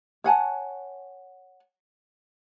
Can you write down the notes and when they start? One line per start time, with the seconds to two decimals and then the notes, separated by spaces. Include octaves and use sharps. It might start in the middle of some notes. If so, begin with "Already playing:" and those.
0.24 C#5 F#5 G#5 A5